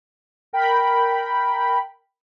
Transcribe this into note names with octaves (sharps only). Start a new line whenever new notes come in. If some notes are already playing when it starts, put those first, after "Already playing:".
A#4 G5 B5